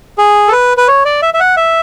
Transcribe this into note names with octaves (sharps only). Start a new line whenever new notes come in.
G#4
A4
B4
B4
C#5
D5
E5
E5
F#5
E5